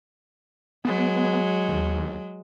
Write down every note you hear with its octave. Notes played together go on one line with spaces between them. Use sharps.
F#3 G#3 B3
D#2